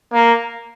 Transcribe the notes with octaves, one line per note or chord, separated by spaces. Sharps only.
A#3